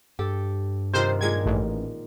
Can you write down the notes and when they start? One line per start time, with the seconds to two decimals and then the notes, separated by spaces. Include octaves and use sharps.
0.19 G2 G4 A4
0.93 C3 D#3 F3 C5
1.21 A#2 G#3 G5 G#6
1.46 A1